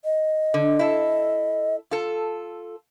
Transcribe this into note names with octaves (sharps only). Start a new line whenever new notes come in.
D#5
D3
E4 A4
F4 A4